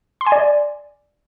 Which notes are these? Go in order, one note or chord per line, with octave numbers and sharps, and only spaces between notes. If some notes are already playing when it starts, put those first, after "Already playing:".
C6
G#5
D5